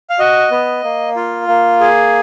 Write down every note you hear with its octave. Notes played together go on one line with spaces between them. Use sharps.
F5
F#4 D#5
B3
A#3
F4
A#3
G#4